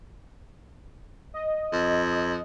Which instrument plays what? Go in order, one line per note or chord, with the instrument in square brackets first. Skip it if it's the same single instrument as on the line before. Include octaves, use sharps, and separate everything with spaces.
[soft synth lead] D#5
[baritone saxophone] F2